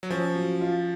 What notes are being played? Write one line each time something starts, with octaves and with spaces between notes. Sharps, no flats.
F#3
F3 C#4
F#3
F4